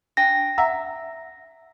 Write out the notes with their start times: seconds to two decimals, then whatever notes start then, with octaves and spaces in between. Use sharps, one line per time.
0.17 D4 G5 G#5 A#6
0.58 E5 F#5 A#5 E6